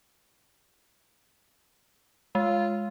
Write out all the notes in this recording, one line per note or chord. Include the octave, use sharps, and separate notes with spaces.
G#3 F4